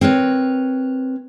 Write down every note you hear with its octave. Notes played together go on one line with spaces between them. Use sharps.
C4 A#4 B4 C#5